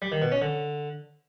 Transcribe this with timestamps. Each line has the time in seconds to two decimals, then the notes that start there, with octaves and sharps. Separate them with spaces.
0.02 G3
0.12 D#3
0.22 B2
0.32 C#4
0.42 D3